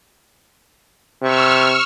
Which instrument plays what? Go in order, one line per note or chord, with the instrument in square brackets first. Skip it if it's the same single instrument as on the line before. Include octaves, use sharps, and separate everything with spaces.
[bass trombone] C3 [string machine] C#6 E6 F6